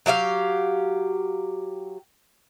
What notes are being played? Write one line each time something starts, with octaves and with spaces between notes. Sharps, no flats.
F#3 G4 E5 F5